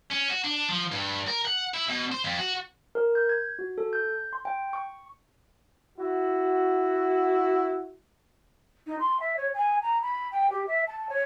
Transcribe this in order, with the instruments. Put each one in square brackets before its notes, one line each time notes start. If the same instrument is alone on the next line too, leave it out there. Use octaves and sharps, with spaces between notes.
[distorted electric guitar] C#4
F#4
D4
F3
G2
A#4
F#5
E4
B2
C5
F2
F#4
[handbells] A#4
G6
G#6
F#4
A4
G6
C6
G5
C#6
[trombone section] E4 F#4
[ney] D#4
C6
E5
C#5
G#5
A#5
B5
G5
G4
E5
A5
C#5